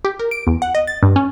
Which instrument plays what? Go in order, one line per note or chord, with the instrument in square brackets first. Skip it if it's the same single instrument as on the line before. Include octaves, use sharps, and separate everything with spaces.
[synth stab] G4
A#4
D7
E2
F#5
D#5
A6
G2
C#4